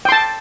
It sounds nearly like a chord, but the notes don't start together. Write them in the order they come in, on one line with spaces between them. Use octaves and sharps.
G5 C6 A5